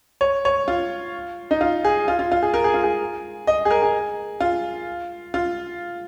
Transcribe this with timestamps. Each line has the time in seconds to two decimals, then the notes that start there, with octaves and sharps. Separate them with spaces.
0.21 C#5
0.45 C#5
0.68 F4
1.51 D#4
1.61 F4
1.84 G#4
2.08 F4
2.19 F4
2.32 F4
2.42 G#4
2.54 A#4
2.64 G#4
2.74 F4
2.84 G#4
3.47 D#5
3.65 G#4
3.71 A#4
3.82 G#4
4.40 F4
5.34 F4